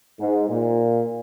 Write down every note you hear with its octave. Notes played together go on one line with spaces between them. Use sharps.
G#2
A#2